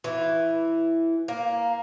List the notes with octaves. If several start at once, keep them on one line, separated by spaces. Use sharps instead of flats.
E3
A#3